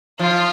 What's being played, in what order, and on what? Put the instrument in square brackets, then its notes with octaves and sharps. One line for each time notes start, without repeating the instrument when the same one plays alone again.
[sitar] F3 [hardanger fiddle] F4